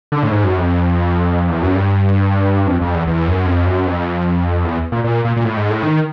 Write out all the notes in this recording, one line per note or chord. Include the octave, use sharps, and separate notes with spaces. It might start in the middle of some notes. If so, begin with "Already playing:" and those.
D3
A2
G#2
F#2
F2
E2
F#2
G2
F2
F2
E2
E2
F#2
F2
F#2
F2
E2
A#2
A#2
A#2
A#2
A2
G#2
A2
D#3